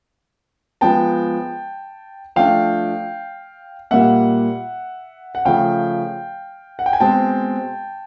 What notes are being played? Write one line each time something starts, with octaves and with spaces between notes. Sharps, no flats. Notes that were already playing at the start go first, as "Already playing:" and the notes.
F3 G#3 B3 G5 A5
F3 A3 D4 F5 G5
A#2 G3 A#3 E5 F#5
F#5
C#3 F3 A3 F5 G5
F#5
G5
G#5
B2 G#3 C4 G5 A5